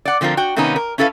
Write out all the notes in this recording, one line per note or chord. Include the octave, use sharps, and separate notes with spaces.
D5 F#5
D3 F3 C4 F4 A#4
F#4 G5
C3 D#3 A#3 B3 C#4 D#4
A#4
C#4 E4 A4 B4 F5